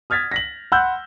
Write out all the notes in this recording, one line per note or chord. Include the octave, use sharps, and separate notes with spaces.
D#6 F6 G#6 A6 B6
A#6 B6 F#7
F#5 B5 C6 E6 F#6 G6